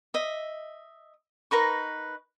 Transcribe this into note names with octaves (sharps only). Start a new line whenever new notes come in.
D#5 E5
D#4 A#4 B4 C#6